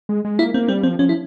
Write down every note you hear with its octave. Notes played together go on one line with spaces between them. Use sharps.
G#3
G#3
A#3 E4
A#3 C4
G3 C4
F3 C4
F3 C#4
E4